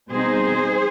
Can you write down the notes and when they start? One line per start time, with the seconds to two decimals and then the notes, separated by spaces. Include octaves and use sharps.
0.11 B2 G3 C4 D#4 G#4 C5